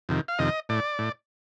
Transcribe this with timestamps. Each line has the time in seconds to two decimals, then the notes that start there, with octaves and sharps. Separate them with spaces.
0.09 F2 C3 D#3
0.28 F5
0.39 F2 C3 D#3 D#5
0.69 A2 D5
0.99 A2